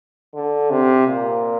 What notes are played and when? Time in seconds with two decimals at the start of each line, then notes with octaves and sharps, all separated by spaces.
0.35 D3
0.70 C3
1.07 A#2